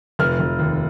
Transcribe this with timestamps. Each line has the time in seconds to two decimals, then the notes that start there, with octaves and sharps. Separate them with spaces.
0.19 F1 F6
0.40 F1
0.59 D#2